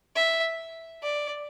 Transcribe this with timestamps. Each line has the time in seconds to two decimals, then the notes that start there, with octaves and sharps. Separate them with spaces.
0.16 E5
1.03 D5